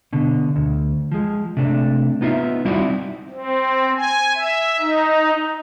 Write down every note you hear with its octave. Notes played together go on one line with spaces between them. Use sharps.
B2 D3
D2
F3 G#3
C3 A3 D4
B3 D#4 F4 C5 E5
G3 C4 D#4 E4 F#4 D5
C4
G#5
E5
D#4